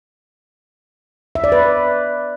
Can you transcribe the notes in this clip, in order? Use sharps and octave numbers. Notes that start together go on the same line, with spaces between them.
E5
D5
B4